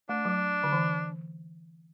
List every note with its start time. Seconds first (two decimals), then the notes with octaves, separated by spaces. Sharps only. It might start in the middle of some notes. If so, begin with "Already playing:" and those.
0.09 A3 D4
0.25 F#3
0.63 D3
0.73 E3